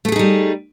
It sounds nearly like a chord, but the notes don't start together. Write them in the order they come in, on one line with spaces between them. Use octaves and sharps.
A3 A4 G#4 D#4 G3